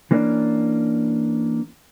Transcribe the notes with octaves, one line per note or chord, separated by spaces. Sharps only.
E3 A#3 C#4 D4